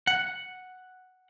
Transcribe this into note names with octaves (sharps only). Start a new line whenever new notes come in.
F#5